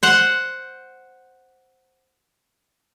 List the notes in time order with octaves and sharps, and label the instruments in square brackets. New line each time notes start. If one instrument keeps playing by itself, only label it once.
[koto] C5 F#5